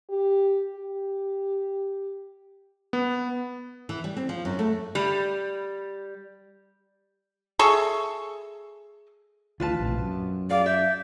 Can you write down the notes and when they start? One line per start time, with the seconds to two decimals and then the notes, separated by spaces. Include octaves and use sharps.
0.10 G4
0.76 G4
2.93 B3
3.89 E3
4.04 G3
4.17 C4
4.29 F3
4.45 F#2
4.59 A3
4.95 G3
7.59 G#4 A4 E5 C#6
9.60 D2 E3 F4 B4 A5
9.78 A#1 A2 C3
9.99 F#2
10.50 G#4 D5 F5
10.66 E5 G6